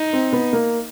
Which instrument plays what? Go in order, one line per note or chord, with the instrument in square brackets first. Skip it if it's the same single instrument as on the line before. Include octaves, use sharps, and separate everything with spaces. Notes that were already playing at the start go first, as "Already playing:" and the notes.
Already playing: [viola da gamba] D#4
[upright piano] C4
B3
A#3